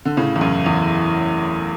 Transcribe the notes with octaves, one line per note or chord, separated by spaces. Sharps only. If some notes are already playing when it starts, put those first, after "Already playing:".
D3
A2 C#3
E2
F#2
E2